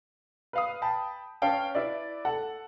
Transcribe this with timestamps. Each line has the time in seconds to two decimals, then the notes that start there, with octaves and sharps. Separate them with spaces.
0.53 B4 F5 D#6
0.82 G5 A5 B5
1.42 C#4 B4 F5 G5 A5
1.75 E4 B4 D5
2.25 A4 F#5 A5